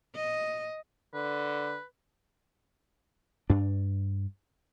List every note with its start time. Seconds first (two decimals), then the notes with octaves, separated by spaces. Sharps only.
0.15 D#5
1.15 D3 B4
3.50 G2 D4